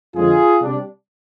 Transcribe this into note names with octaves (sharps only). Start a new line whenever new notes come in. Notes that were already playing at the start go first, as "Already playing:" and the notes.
F2 D3 G#3 F4 G#4
C3 G3 D4